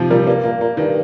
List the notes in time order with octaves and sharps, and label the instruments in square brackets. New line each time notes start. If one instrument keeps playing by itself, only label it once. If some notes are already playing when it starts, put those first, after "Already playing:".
Already playing: [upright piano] C3 D#3 F3
[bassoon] A#2 [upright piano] G3
[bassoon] A#2
[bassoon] G2 [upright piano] A#3
[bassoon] A#2 [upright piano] A#3
[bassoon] A#2 [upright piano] A#3
[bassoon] G2 [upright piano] D#3